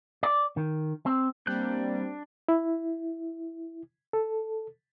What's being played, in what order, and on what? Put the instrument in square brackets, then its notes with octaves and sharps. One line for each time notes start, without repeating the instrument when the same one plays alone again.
[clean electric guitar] D5
D#3
C4
[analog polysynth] G3 [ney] A#3 [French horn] C4 [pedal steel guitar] D4 F#6 G6
[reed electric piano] E4
A4